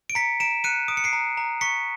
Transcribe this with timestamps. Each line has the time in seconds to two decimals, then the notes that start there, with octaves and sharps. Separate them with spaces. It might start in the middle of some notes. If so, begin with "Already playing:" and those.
0.10 D7
0.15 A#5 B6 C#7
0.40 A#5 D7 E7
0.64 F#6 C#7 D#7
0.88 D#6 D7
0.97 C#7
1.04 C7 D7
1.13 A#5
1.37 A#5
1.61 C#6 B6 C#7